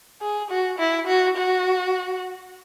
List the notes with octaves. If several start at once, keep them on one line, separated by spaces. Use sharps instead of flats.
G#4
F#4
E4
F#4
F#4